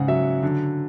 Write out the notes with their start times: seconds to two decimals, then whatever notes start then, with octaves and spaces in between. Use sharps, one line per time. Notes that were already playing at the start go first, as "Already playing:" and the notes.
Already playing: G#2 C#3 F#5
0.08 F#3 E5
0.43 D3